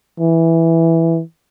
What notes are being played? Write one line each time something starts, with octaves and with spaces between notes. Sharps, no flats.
E3